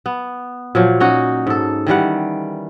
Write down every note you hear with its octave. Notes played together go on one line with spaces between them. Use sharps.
B3
A#2 F3 F#3
C#4 D#4 F#4
G#2 A4
D#3 E3 G3 F#5